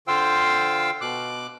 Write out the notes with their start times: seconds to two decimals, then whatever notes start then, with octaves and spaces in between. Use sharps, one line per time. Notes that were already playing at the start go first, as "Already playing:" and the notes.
0.08 D3 F4 C5 F5 G5 E6
1.01 B2 D6 F#6